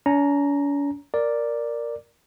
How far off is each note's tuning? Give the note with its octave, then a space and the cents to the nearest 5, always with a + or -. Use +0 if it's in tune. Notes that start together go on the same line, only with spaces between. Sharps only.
C#4 +45 A#5 +0
A#4 +0 D5 +0